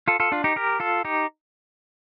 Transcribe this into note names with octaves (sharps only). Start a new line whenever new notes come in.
F4 A4
F4 A4
D4 F4
D#4 G4
G4 A#4
F4 A4
D#4 G4